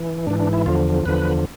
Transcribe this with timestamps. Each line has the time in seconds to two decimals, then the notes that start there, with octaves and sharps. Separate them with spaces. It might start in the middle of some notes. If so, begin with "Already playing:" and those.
Already playing: E3
0.27 G#2 E3 D4
0.40 D4
0.53 E4
0.66 E2 D3 F3 F4
1.05 E2 D3 F3 B4